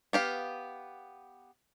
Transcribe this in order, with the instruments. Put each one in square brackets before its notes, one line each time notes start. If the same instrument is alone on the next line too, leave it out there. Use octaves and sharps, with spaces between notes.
[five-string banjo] B3 G4 F5